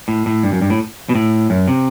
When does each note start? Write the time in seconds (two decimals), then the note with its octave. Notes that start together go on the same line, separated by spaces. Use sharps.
0.08 A2
0.26 A2
0.43 G2
0.52 F#2
0.61 G2
0.70 A2
1.09 B2
1.15 A2
1.50 F#2
1.68 C3